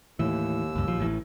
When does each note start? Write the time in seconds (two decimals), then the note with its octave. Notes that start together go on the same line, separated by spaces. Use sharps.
0.19 D#2 A2 E3 E6
0.76 C#2 G2
0.87 A#1 F3
0.99 A1 A2 E3